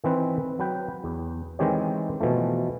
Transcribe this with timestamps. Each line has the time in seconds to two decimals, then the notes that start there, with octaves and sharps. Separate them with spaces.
0.04 D#3 E3 C4 B4
0.59 F#3 B4 G5
1.04 E2
1.59 D#3 E3 G#3 C4 G4 C#5
2.21 B2 E3 F3 A3